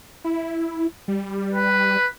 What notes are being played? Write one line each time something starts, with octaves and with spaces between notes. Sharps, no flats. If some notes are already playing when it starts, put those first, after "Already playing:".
E4
G3
B4